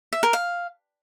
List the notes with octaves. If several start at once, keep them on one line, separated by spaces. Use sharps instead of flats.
E5
A#4
F5